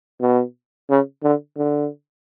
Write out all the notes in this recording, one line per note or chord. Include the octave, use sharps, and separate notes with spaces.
B2
C#3
D3
D3